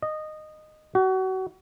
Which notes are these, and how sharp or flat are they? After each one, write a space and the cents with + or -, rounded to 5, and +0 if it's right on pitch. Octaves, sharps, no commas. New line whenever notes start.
D#5 -15
F#4 +30